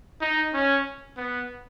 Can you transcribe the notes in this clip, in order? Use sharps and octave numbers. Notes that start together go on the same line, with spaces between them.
D#4
C#4
B3